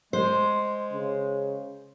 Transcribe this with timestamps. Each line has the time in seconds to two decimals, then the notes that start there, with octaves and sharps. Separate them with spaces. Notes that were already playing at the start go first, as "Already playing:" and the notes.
0.13 G#3 C5
0.92 C#3